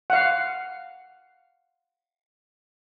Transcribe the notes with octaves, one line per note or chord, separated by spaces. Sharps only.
F5 F#5